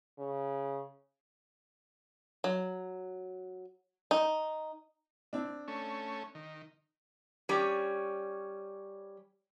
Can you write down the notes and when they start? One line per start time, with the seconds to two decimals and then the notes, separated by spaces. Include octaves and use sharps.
0.19 C#3
2.44 F#3
4.11 D#4
5.33 C4 D4
5.68 A3 C#4
6.35 D#3
7.49 G3 C#4